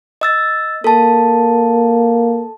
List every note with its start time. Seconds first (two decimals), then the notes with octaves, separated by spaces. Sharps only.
0.21 D#5 E6 A6
0.84 A#3 A4 A5